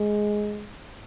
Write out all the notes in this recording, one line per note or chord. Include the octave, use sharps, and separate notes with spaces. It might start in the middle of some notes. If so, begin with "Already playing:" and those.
Already playing: G#3